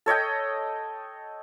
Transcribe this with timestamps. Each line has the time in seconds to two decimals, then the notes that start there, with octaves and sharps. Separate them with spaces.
0.06 A4 C#5 D#5 G5